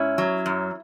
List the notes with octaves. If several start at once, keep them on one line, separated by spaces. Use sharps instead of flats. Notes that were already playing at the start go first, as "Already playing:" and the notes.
Already playing: G#2 C#4 E4
F#3
F#2